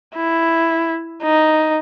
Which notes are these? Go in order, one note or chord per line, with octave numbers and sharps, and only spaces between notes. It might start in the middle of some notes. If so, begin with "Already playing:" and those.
E4
D#4